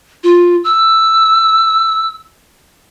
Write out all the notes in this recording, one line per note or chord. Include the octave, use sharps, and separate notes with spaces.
F4
E6